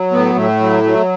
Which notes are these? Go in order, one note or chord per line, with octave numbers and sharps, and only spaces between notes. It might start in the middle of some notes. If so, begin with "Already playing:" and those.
Already playing: F#3
A2 B3
A2 A3
F#3
F#3